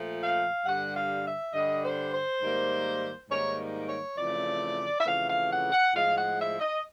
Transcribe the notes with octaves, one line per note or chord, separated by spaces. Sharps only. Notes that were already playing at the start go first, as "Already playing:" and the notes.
Already playing: A#2 F3 A3
F5
G2 D3 G3 F#5
F5
E5
G2 D3 G3 D#5
C5
C5
G#2 D#3 G3 A#3
G#2 D#3 G3 A#3 C#5
C#5
F2 C#3 E3 A3 D5
E5
F2 C#3 E3 A3 F5
F5
F#5
F#5
A2 F3 G#3 F5
F#5
E5
D#5